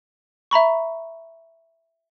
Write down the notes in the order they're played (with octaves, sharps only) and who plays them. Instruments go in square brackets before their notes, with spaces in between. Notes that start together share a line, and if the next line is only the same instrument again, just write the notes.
[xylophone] E5 A#5 B5 C#6